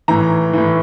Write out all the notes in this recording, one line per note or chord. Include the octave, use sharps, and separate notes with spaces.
A2 E3 A#5
A2 E3